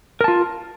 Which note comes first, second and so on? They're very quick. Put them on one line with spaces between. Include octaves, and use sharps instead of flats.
A#4 A5 F4